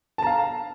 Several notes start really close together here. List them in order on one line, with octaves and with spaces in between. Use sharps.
A5 A#5 F5